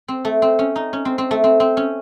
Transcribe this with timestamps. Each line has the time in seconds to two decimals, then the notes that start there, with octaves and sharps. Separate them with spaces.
0.08 C4
0.25 A3
0.42 C4
0.59 C#4
0.76 D#4
0.93 C#4
1.05 C4
1.18 C4
1.31 A3
1.44 C4
1.60 C4
1.77 C#4